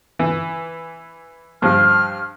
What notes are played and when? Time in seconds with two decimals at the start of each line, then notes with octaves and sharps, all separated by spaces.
0.19 E3
1.62 G2 F3 F6